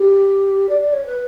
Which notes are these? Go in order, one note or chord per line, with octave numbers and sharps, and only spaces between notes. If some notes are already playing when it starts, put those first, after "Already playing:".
Already playing: G4
D5
D5
C#5
B4